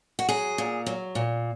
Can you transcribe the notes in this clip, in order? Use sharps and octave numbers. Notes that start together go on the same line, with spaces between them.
F#4
F#3 G#4
A#2
F#3
A#2